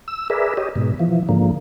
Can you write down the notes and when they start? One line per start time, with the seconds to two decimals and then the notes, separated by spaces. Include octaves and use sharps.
0.08 E6
0.30 G#4 A#4 B4 D5 E5
0.57 G4 C#5 D#5
0.76 G#2 B2
1.00 E3 F3
1.29 G#2 D3 F3 A#3